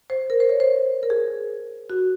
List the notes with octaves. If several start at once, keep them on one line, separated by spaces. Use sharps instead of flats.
C5
A#4
C5
C#5
C5
A#4
G#4
F#4